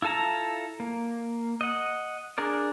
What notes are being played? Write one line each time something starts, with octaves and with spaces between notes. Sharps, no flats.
E4 F4 A4 A5 A#5
A#3
D#5 F#5
D4 G#4 A#4 D5